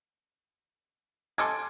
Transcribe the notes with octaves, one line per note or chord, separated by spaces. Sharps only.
A4 D#5 G#5 C6 D6 G#6